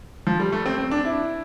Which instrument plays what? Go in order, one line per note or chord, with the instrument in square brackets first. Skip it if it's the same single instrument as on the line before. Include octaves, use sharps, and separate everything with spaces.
[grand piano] F3
G3
A3
C4
C4
D4
E4